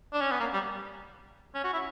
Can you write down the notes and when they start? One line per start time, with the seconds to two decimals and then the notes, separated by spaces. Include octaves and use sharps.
0.13 D4
0.21 C#4
0.31 B3
0.40 A#3
0.54 G3
1.55 C#4
1.64 F#4
1.73 E4